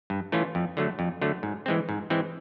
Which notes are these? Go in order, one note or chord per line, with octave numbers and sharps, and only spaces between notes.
G2
E3 A3 C#4 F4
F2
D3 F#3 A3
F2
D3 F#3 A3
G#2
E3 G#3 C4
G#2
E3 G#3 C4